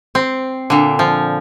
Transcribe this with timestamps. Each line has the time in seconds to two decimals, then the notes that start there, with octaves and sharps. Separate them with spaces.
0.15 C4
0.70 A#2 D3
0.99 F3